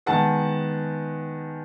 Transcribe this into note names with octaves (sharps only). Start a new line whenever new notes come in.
D#3 G#3 B3 F#5 A5